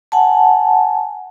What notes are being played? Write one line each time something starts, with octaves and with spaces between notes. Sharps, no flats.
F#5 G#5 A5